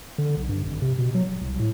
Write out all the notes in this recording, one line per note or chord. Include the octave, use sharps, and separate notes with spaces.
D3
B1
G2
G#1
C3
B2
F#3
D1
C2
A2